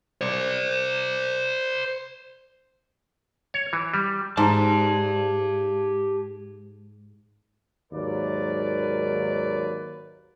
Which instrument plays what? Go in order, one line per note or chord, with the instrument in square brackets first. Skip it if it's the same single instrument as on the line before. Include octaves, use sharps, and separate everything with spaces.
[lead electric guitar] C5 D5
[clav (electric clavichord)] C#5
E3
G3
[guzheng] G#2 [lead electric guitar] G4 A5
[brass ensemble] D#2 G#2 F#3 A#4 B4 D5